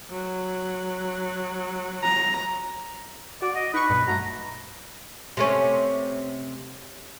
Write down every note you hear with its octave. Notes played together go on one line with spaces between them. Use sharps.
F#3
A#5
F#4 D5
D#5
D#4 B4 C#6
B1 G2
F#3 A3 A#5
C3 A3 C#4